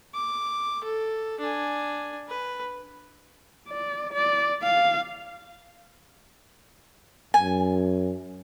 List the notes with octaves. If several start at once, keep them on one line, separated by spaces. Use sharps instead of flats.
D6
A4
D4 G#5
B4
D5
D5
F5
F#2 G#5